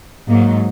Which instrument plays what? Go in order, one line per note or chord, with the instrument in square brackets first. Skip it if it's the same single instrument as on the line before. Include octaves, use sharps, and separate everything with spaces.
[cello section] G#2 F#3 A#3